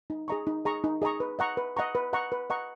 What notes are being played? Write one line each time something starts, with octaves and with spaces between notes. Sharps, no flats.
D#4
G#4 D#5 A#5 C#6
D#4
G#4 D#5 A#5 C#6
D#4
G#4 D#5 A#5 C#6
B4
D#5 F#5 A#5 C#6
B4
D#5 F#5 A#5 C#6
B4
D#5 F#5 A#5 C#6
B4
D#5 F#5 A#5 C#6